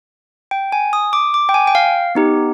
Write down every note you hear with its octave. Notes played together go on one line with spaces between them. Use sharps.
G5
G#5
D#6
D6
D6
G5
G#5
G5
F5
B3 D#4 G4